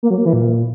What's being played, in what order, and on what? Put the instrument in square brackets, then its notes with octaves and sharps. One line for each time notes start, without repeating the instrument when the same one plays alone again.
[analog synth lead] A#3
F#3
A#3
E3
A#2